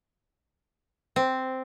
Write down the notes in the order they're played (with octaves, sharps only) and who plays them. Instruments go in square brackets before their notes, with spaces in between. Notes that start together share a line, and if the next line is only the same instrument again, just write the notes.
[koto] C4